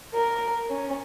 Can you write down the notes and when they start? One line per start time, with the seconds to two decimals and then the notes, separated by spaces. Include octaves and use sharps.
0.14 A#4
0.70 C#4